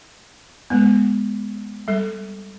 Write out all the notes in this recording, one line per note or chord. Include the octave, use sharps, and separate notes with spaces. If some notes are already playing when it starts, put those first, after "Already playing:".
G#3 B3
G3 A4